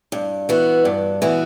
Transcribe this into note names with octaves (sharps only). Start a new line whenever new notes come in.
G2
E3 B3 F#4
G2
E3 B3 F#4